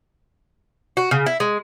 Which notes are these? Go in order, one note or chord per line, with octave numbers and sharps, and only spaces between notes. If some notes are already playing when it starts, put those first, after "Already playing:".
F#4
C#3
E4
G#3